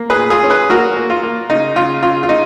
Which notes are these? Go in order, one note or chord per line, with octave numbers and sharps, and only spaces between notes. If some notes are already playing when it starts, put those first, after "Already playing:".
Already playing: A#3
G#4 B4
A#2
F4 G#4
C#4
G#4 B4
A#3 F#4 A#4
A#3
F4
A#3
C#3 D#4
C#3 F4
C#3 F4
F4
C#3 D#4